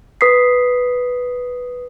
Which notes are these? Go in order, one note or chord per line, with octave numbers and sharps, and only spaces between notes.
B4 D#6 B6 C7